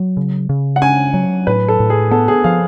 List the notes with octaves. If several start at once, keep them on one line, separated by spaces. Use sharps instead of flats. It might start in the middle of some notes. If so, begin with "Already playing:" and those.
Already playing: F#3
C#3
C#3
F#5
C#4 G#5
F#3
A2 B4
A4
A2
G#4
B3 A4
G#4
F3 F5